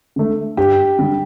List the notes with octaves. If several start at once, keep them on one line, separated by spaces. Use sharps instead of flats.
D3 A3
G2 G4
D3 G3